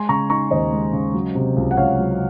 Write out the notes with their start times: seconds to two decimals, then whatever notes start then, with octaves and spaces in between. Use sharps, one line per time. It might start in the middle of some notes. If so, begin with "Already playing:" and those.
Already playing: G#3 G#5 C6
0.09 C#3 A#5 C#6
0.30 D#4 A#5 C#6
0.51 D#2 C5 D#5
0.72 G#3
0.93 C#3
1.14 F#3
1.35 C3
1.56 C#2
1.71 F#5
1.77 C#2 C#5 F5
1.99 F#3